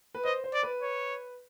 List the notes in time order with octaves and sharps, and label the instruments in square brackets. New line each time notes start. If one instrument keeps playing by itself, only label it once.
[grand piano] B4
[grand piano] C5 [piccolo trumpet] D#5
[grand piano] C5
[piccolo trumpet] D5
[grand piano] B4
[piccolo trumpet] C#5